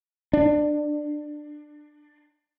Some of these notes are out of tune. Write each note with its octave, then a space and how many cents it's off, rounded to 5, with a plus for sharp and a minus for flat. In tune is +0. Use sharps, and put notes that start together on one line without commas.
D4 +20